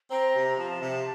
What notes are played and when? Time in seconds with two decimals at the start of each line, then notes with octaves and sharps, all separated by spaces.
0.11 C4 A#5
0.35 C3
0.58 F3 A5
0.82 C3